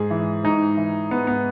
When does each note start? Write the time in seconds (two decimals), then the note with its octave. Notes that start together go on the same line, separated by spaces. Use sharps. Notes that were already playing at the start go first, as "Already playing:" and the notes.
Already playing: G#2 G#4
0.10 E3
0.44 G#2 D#4
0.77 E3
1.11 G#2 B3
1.27 B3